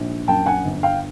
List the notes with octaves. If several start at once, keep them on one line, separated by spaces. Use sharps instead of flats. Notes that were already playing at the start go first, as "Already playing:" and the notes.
Already playing: A#1 G#2
F#2 G5 A5
F#5 G#5
G1
F5 G5